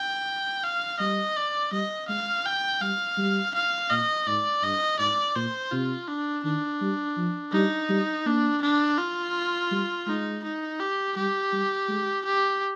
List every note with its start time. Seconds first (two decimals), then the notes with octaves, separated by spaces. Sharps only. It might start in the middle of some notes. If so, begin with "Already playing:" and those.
Already playing: G5
0.64 F5
1.00 G3 D#5
1.36 D5
1.72 G3 D#5
2.08 G#3 F5
2.46 G5
2.81 G3 F5
3.18 G3
3.55 F5
3.90 A#2 D#5
4.27 G#2 D5
4.63 G2 D#5
4.99 G#2 D5
5.36 A#2 C5
5.71 C3 F4
6.08 D4
6.44 D#3 D4
6.81 G3
7.17 F3
7.53 G3 D#4
7.89 G3
8.26 A#3 D4
8.62 D4
8.98 F4
9.71 G3
10.07 G#3 D#4
10.44 D#4
10.80 G4
11.16 G3 G4
11.53 G3
11.88 G#3
12.25 G4